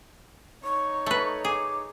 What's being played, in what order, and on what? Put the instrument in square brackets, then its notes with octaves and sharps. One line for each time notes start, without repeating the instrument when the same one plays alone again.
[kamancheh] D#4 C#5 [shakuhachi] C#6
[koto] A3 B4
[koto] G#4 [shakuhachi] D6